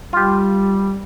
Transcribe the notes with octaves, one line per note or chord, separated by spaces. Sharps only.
G3 F4 G4